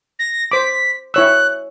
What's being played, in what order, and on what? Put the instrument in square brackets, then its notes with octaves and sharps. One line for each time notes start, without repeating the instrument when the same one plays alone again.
[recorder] A#6
[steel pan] C5 D6 [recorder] B6
[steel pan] E4 C#5 E6 [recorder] F#6